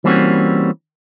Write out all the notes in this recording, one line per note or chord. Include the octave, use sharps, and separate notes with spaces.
E3 G3 A#3 C4 C#4 F#4